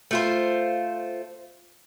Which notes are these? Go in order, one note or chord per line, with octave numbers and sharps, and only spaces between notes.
A3 F4 C5